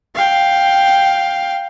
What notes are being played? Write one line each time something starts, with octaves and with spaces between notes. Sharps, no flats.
F5 G5